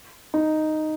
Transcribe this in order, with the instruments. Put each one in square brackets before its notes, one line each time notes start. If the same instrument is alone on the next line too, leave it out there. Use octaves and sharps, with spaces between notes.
[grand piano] D#4